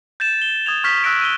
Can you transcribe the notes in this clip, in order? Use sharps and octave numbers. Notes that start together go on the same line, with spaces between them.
G6 A6 E7
G7
D#6 G#6 F7
C#6 F6 G6 B6
E6 F#6 A#6 B6 D7
D#7 G7